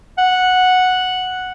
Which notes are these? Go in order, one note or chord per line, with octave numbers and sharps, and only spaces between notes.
F#5